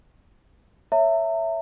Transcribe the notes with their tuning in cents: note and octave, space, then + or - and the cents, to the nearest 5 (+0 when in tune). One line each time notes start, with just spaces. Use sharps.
C#5 +0 E5 +5 A#5 -40